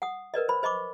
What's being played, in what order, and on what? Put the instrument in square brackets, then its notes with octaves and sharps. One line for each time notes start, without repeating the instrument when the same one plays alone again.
[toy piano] F#5 D#6
A#4 B4 D5 D#5
C5 B5
C5 D#5 B5 C#6 D6